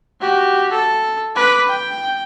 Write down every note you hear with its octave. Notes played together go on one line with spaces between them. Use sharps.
F#4 G4
A4
B4 D6
G5